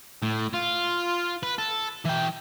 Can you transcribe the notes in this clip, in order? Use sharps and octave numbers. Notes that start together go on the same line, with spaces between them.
A2
F4
B4
A4
E3 G5